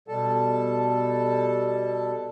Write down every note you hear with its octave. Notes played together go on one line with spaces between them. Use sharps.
B2 G3 A4 A5